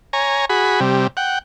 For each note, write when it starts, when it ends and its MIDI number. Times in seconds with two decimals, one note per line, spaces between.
0.13 0.45 73
0.13 0.45 80
0.13 0.45 82
0.49 0.80 66
0.49 0.80 68
0.49 0.80 83
0.80 1.07 48
0.80 1.07 55
1.17 1.39 78
1.17 1.39 79